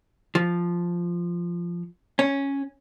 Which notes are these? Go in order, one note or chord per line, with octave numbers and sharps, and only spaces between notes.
F3
C#4